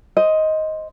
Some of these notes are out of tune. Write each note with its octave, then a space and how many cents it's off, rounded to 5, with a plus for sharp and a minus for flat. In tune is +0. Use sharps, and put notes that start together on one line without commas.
C5 +0 D#5 +10